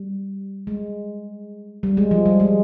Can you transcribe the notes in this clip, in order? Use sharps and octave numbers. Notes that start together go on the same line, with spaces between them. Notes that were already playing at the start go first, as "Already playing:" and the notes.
Already playing: G3
G#3
G3
G#3
F3
G3
G#3